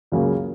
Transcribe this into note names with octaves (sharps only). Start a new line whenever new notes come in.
C#2 C#3 F#3 A#3